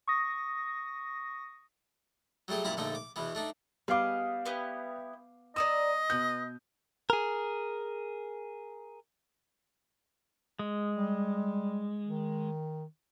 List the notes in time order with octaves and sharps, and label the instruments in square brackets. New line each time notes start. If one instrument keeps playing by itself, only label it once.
[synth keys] C#6 D#6 A#6
[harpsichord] F#3 G3 A3 G4 G#4
F#2 A#2 G3 E4 A#5 B5
A#1 D3 A3 D#4 G5
D6
E2 B2 E3 B3
A3 D4 D#4
[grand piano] G3 D6 [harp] B3 F5 [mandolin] G#4 D#5
[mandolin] B3 E4 G4 [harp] D#7
[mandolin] D5 A#5 E6 [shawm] D#5 [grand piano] D#6
[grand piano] B2 G6 [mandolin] B3
[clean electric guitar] G#4 A#4
[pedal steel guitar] G#3
[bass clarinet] G3
D#3